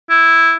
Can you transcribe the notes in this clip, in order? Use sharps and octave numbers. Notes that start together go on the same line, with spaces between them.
E4